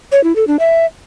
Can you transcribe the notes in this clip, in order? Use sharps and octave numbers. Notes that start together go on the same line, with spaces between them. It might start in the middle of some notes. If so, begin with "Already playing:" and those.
C#5
E4
A4
D4
E5